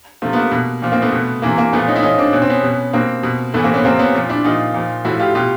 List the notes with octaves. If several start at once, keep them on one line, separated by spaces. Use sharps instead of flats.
C3 F3 A3
B3
A#3
B2
A#2 F3
A#3 C4
A3 B3
B2
C3 E3 A#3
A#3
A#2 F3 A3 B3
C#4 D#4
E4
A2 F3 C#4 D#4
C4 D4
B2 C#4
C4
B3 C#4
B2
B2 A#3 C4
B2
A2 E3 A3 B3
A#3 C4
B3 C#4
C3 F3 A#3 C4
B3 C#4
A#2 F3
D4 E4
A#2 F3 D#4 F4
A#2 F3
A2 F3 E4 F#4
F4 G4
B2 F4 G4